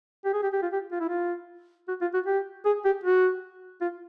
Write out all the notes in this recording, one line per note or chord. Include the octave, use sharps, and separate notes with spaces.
G4
G#4
G4
G4
F4
G4
F4
E4
F4
F#4
F4
F#4
G4
G#4
G4
F#4
F4